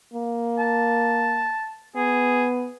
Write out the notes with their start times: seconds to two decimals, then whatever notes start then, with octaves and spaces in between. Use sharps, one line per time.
0.14 A#3
0.59 A5
1.96 B3 G#4